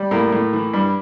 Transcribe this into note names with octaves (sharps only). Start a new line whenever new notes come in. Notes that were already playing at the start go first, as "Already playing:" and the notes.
Already playing: G3
A2 A#3 A#4
A2
E3
G2